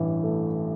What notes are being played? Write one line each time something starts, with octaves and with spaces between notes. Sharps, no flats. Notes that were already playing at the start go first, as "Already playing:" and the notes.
Already playing: A1 G2 E3
A3